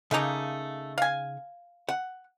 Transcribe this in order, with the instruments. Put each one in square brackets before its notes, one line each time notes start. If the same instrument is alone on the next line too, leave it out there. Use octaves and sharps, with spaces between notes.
[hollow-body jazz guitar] C#3 D#4 A#5 [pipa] A3 A#3
[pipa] F5 G#5
[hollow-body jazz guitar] F#5